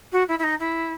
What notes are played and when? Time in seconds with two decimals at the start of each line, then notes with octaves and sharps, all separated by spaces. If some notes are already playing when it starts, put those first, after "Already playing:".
0.12 F#4
0.28 E4
0.39 E4
0.43 D#4
0.60 E4